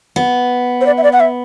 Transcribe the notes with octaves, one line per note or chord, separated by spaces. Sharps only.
B3
C5
D5
E5
D5
F#5
E5